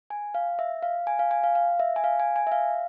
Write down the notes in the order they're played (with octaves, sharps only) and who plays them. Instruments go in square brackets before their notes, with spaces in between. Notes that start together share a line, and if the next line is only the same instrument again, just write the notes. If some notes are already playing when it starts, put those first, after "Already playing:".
[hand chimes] G#5
F5
E5
F5
G#5
F5
G#5
F5
F5
E5
G#5
F5
G#5
G#5
E5
F5